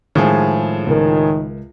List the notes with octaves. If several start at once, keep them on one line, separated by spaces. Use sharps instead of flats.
A2 D#3 F3 G#3 G#4
C#2 D#3 A#4